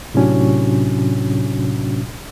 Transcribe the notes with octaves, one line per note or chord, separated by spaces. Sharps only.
A2 C3 F#3 C#4 D4 F#4